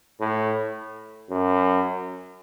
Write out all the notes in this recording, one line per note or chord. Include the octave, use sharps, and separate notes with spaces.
A2
F#2